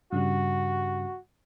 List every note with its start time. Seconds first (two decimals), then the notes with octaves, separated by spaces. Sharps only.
0.12 G2 C#3 G3 F#4